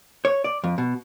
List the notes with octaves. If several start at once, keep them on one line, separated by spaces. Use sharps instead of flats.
C#5
D5
F2
B2